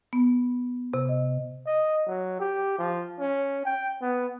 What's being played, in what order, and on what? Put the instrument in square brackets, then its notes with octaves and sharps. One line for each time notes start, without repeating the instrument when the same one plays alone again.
[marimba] B3
C3
D#5
[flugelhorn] D#5
F#3
G4
F3
C#4
G5
B3